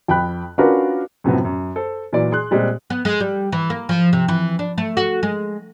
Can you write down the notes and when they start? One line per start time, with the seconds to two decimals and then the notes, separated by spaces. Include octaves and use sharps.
0.08 F2 G5 B5 F#6
0.58 C#4 D4 F4 F#4 A#4 B4
1.24 F#2 A2 C3 F3 F#3 B3
1.45 F#2
1.76 A4 C5
2.13 A#2 E3 F#3 D5
2.32 G#4 C6 F#6
2.51 A#2 G3 G#3 C4
2.90 B3
3.05 G#3
3.20 G3
3.52 E3
3.70 A#3
3.89 F3
4.13 C3
4.28 E3
4.59 D4
4.78 A3
4.97 F#4
5.23 G#3